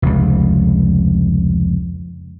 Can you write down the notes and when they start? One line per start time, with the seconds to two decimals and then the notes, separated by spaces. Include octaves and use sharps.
0.02 F1 C#2